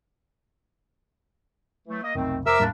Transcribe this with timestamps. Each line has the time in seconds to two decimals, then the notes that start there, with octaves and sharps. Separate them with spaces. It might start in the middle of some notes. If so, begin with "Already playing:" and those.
1.87 E3 F#3 A3
2.03 A#3 D#5
2.15 F1 B1 D#3 A3 C4
2.46 F1 C3 A#4 C5 E5 D6 E6
2.60 E2 A2 G3 A#3 D4